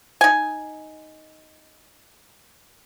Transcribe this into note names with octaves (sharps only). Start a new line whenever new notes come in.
D#4 G#5